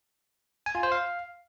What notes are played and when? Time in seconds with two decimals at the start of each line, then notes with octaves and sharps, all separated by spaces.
0.66 G#5
0.75 F4
0.83 C5
0.92 F5